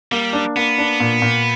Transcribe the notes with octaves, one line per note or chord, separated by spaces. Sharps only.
G3 A#3
D4
A#3 B3
D4
A#2
A#2